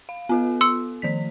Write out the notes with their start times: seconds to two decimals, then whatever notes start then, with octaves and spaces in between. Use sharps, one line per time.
0.09 F5
0.29 B3 F4 A4
0.61 C6 E6 C#7
1.02 D#3 F3 B6